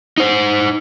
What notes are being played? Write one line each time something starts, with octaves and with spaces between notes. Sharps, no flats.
D#4 C5